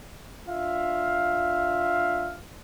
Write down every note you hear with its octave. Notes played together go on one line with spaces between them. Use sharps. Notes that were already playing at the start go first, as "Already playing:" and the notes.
D4 F4 E5 F5